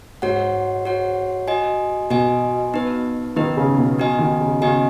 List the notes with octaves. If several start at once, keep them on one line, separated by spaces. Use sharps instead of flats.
G#2 F#4 C#5 F#5
F#4 C#5 F#5
F#4 D#5 G#5
B2 F#4 D#5 G#5
B3 D#4 B4
D#3 B3 D#4 B4
C#3
B2
B3 F#4 D#5 G#5
D#3
C#3
C#3 B3 F#4 D#5 G#5